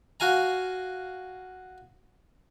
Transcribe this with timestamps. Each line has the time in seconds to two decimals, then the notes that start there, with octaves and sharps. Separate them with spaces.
0.20 F#4 F5 G#5 A#5